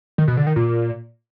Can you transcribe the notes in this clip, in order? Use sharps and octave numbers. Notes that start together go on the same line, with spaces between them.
D#3
B2
D3
D#3
A#2